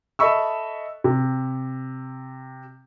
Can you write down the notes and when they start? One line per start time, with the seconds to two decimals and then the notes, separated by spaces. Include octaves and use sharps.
0.19 A4 D#5 E5 B5 C#6 E6
1.04 C3